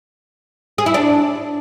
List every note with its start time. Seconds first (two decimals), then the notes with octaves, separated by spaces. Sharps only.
0.78 G#4
0.86 E4
0.94 D4